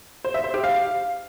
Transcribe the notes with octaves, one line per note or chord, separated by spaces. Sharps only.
C5
E5
C5
G4
F5